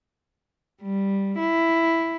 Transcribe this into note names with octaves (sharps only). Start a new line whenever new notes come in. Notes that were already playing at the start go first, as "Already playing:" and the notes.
G3
E4